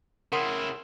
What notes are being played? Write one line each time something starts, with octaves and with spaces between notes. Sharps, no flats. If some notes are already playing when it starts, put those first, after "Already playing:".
C#3 E4 A#4 F#5 C6